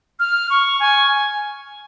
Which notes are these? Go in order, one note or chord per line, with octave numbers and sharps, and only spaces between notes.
F6
C#6
G#5